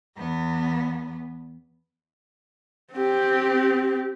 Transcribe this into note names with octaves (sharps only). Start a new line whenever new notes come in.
E2 B3
C4 G4